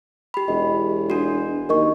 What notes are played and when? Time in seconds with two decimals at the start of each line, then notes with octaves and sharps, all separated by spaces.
0.34 G4 B5
0.48 E1 D#5
1.10 D4 F#4
1.69 D#2 A#4 D#5 C#6